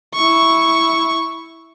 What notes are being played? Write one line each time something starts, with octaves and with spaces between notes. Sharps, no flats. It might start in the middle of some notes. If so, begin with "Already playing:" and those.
E4 C#6